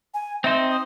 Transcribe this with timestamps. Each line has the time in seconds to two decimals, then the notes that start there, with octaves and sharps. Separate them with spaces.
0.14 G#5
0.44 C4 D#4 C5 E5
0.70 D#6